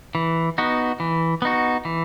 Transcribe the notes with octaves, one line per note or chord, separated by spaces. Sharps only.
E3
B3 D#4 F#4
E3
B3 D#4 F#4
E3